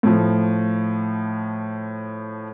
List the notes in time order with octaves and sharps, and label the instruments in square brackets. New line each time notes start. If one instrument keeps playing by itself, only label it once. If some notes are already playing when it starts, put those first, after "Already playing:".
[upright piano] A2 F3